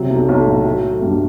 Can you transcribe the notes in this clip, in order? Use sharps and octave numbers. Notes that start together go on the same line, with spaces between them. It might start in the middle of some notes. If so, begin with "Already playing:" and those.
Already playing: C3 F#3
B1
B1
A2
F#3
A3
G2